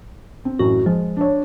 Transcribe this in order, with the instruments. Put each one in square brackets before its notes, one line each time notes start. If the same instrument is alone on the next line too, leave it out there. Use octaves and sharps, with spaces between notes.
[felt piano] C4
[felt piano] A1 F#2 [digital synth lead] F#4
[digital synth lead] F3 [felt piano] G#3
[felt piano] D4 C#5